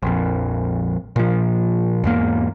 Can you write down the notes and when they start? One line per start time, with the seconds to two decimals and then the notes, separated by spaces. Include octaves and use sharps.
0.03 A#1 F2
1.16 A#2 F3
2.04 E2 G#2 A#3